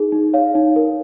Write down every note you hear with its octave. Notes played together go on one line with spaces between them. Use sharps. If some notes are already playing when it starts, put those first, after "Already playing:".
Already playing: D#4 G#4
D#4
C#5 F5
D#4
A#4